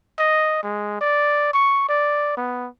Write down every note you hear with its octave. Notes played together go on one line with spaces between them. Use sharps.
D#5
G#3
D5
C#6
D5
B3